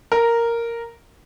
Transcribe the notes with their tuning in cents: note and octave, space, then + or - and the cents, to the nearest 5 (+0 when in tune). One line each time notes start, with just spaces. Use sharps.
A#4 -5